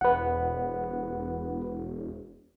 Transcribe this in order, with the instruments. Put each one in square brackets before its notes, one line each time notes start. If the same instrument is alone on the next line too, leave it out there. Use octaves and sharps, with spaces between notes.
[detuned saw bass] E1 [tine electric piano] B4 F#5